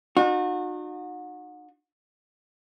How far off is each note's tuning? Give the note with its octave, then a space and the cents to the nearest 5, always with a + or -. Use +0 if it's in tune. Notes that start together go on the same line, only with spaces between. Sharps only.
D#4 -35 F#4 -35